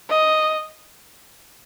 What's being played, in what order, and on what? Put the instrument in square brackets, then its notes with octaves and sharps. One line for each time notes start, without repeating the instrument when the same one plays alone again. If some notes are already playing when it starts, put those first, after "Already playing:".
[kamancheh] D#5